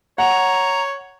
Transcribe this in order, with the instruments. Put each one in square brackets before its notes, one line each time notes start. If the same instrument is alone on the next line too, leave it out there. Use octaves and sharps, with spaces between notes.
[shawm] C#5 [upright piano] F#5 [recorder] A#5